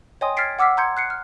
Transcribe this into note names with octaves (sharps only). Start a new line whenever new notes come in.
C#5 D#5 G5 G#5 C6 D#6
F6 G#6 A6 B6 C7 D7
F#5 D6 E6 F6 B6 C7
A#5 C6 G6 G#6 C#7
F#6 C7 C#7
F6